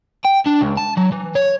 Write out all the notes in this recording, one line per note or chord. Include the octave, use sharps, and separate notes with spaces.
G5
D4
C#2
A5
F#3
E3
C#5